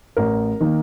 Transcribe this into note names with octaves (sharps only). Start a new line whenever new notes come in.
A1 A#4
D#3 A#3